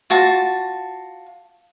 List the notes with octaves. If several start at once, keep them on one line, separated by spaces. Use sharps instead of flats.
F4 F#4 A5